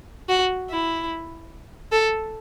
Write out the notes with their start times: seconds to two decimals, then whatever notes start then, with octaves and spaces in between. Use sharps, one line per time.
0.29 F#4
0.70 E4
1.92 A4